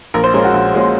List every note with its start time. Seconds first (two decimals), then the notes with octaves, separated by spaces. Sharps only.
0.14 A#1 A#4
0.24 C5
0.34 A#2 G#3 C#4 A#4
0.44 F#4
0.54 A#1
0.74 A#2 G#3 C#4